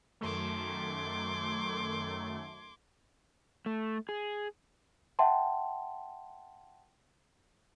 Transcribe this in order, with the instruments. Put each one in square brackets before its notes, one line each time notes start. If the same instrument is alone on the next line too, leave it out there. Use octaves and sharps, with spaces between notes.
[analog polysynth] F#2 D#3 A3 [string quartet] C6 D6 G#6
[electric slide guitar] A3
G#4
[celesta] E5 F#5 G5 A5 C6